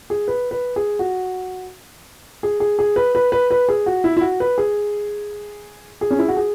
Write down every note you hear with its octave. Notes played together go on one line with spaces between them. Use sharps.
G#4
B4
B4
G#4
F#4
G#4
G#4
G#4
B4
B4
B4
B4
G#4
F#4
E4
E4
F#4
B4
G#4
G#4
C#4
E4
F#4
G#4